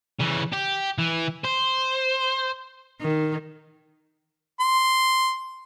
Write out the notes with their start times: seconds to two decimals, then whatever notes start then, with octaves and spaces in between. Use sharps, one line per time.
0.20 C#3 E3
0.53 G4
0.98 E3
1.45 C5
3.01 D#3
4.60 C6